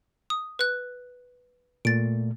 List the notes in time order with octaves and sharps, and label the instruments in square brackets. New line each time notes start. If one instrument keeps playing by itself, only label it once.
[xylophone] D#6
B4 F#6
[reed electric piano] A#2 A3 [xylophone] A6 D7